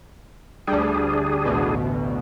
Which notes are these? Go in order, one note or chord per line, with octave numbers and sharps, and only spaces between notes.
D2 G3 D4 G#4
A1 D2 B2